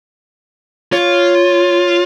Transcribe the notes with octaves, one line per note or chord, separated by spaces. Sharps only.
F4 C#5